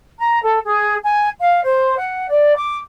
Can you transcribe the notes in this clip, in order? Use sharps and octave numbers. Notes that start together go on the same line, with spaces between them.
A#5
A4
G#4
G#5
F5
C5
F#5
D5
D6